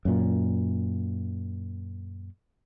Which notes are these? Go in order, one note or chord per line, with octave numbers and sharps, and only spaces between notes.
F#2 A#2